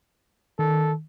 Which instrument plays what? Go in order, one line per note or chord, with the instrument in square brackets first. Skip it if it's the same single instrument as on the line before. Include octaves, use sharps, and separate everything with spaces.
[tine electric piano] D#3 [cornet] A4